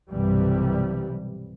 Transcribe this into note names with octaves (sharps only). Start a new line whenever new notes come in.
B1 G2 C3 E3 G3